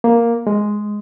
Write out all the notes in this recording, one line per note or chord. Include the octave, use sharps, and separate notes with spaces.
A#3
G#3